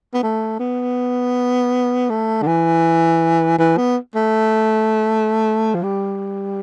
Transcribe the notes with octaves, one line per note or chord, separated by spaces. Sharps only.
B3
A3
B3
A3
D3
E3
E3
B3
A3
F3
G3